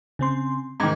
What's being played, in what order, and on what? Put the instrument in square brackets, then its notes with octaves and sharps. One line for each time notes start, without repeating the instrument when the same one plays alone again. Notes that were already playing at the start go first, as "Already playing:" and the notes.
[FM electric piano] C#3 C4 C6
[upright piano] G#2 D#3 [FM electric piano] A#5 D6 G#6